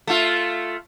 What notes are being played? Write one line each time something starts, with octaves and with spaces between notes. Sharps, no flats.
A3 F4